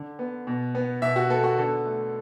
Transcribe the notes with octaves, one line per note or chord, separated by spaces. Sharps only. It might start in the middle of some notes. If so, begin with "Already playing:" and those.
Already playing: D3
B3
B2
B3
B2 E5
F#4
B3 A4
F#4
D3 A4
A3